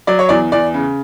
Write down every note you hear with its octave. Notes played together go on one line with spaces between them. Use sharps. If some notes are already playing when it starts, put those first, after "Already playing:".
F#3 D5
C#5
E2 D5
E2 D5
C#3